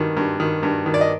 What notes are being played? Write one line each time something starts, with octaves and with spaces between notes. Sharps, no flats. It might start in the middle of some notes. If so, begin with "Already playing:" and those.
Already playing: G2 D#3
G2
D#3
G2
D#3
D5
D#5